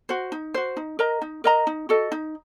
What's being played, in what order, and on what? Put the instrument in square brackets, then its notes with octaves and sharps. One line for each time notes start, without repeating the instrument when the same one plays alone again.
[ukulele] F#4 C5
D#4
F#4 C5
D#4
A#4 D#5 A#5
D#4
A#4 D#5 A#5
D#4
F#4 A4 D#5
D#4